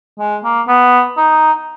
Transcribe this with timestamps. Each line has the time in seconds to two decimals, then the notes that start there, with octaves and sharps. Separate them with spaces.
0.19 G#3
0.44 A#3
0.68 B3
1.17 D#4